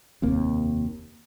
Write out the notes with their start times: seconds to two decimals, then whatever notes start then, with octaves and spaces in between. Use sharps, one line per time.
0.22 F1 D#2 A#3 C4